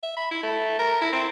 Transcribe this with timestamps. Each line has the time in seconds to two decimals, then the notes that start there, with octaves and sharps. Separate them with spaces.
0.03 E5
0.17 B5
0.31 E4
0.43 A3
0.79 A#4
1.01 E4
1.13 C4